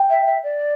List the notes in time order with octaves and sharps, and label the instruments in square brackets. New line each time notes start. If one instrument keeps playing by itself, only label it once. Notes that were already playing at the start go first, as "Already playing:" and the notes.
Already playing: [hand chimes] G5
[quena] E5
E5
D5